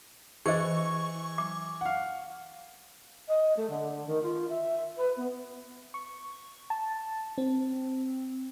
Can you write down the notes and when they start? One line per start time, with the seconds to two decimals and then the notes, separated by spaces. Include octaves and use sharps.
0.46 E3 G#4 C5 D#5 C#6
1.38 D6
1.81 F5 F#5
3.27 D#5
3.56 A3
3.69 D3
4.06 D#3
4.22 F4
4.49 E5
4.96 B4
5.16 B3
5.94 C#6
6.70 A5
7.38 C4